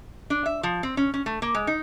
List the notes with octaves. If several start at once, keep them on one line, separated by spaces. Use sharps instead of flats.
D4
E5
F3
C4
C#4
C#4
A3
A#3
G#3
D#4